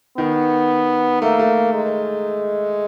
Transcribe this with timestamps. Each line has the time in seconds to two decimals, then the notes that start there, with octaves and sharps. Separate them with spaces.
0.18 D#3 B3
1.22 A3 A#3
1.39 A3
1.74 G#3